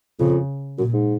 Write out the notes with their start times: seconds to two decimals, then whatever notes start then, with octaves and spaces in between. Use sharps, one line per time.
0.19 F2 C#3
0.78 F#2 A#2
0.93 G#2